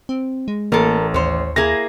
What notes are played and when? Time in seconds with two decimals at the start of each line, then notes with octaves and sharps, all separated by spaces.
0.09 C4
0.48 G#3
0.72 A1 A#3 A4 A#4
1.14 D#2 C5 C#5
1.56 A#3 E4 G#4 A#6